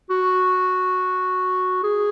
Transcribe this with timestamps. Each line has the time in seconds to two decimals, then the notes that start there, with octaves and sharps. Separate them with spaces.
0.10 F#4
1.84 G#4